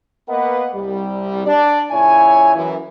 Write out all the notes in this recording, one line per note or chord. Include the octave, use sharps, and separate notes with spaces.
A#3 B3 A#4 B4 D#5 F#5
C2 G3
D4 D5
A#2 C#3 E4 C#5 G#5
F#2 E3